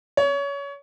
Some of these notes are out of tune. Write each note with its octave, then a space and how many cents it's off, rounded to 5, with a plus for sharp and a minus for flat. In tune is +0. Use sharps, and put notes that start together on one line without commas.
C#5 +25